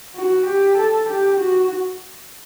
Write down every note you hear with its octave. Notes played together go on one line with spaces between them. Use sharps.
F#4
G4
A4
G4
F#4